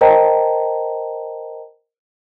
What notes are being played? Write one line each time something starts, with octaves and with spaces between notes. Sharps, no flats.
A#4 C5 D#5 G5 A5 A#5